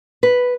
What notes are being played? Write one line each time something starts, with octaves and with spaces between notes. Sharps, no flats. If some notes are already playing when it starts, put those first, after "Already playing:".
B4